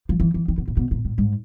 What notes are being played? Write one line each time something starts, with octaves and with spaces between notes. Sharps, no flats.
F3
E3
E3
D#3
B2
A#2
B2
A#2
A2
G#2